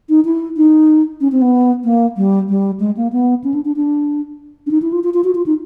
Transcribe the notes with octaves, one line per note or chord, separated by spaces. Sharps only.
D#4
E4
D#4
C#4
C4
B3
A#3
G3
G3
G#3
A#3
B3
C#4
D4
D4
D4
D4
D#4
E4
F4
F4
F4
F#4
F4
D#4